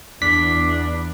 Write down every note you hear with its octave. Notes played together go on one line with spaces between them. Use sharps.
E2 D4 B6